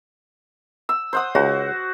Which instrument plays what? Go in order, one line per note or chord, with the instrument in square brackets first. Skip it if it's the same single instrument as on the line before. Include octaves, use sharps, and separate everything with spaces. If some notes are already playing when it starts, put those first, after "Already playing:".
[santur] E6
C5 F#5 D#6
[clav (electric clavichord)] C#2 [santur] F#4